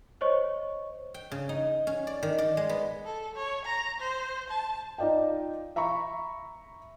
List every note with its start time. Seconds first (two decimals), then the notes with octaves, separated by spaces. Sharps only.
0.21 C5 C#5 D#5 C#6
1.14 G5
1.31 C#3
1.49 D#4
1.87 C#4
2.07 D5
2.23 D#3
2.38 D5
2.57 G#3
2.69 B3
3.05 A4
3.36 C#5
3.65 A#5
4.00 C5
4.50 A5
4.98 D#4 F4 D5 D#5 G5
5.76 E5 A#5 B5 C#6